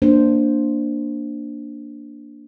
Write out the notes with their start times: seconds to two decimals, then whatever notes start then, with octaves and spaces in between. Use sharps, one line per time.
0.02 A#3 D4 C5